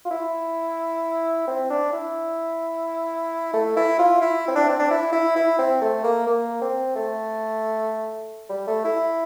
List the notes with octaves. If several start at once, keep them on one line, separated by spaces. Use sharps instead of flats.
F4
E4
C4
D4
E4
A3
E4
F4
E4
C4
D4
C4
D4
E4
E4
E4
C4
A3
A#3
A#3
C4
A3
G3
A3
E4